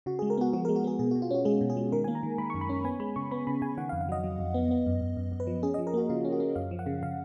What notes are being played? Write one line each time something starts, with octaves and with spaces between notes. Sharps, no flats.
C#3 F#4
G#3 G#4
A#4
B3 F#4
F3 F#4
G#3 A#4
F#4
B3 G#4
B2 G#4
B2 F#4
F4
C#4 F#4
G#3 G#4
B2
G#4
G#3
D#3 A#4
A#3 G#5
A#5
D#3
D#3 B5
F#2 C#6
B5
C#4
B3 G#5
G#3 B5
C#3 C#6
B3 B5
C#3 B5
C#3 G#5
D#3 F#5
F5
F2
F5
F#3 D#5
F#3
F2
B3
B3
F#2
F#2
F#2
F#2
B4
F3
C#4 G#4
F3 D#5
A#4
A#3 F#4
C#3 F4
C#4
F#4
C#4
F#2 F5
F3
F#5
C#3
C#3 F5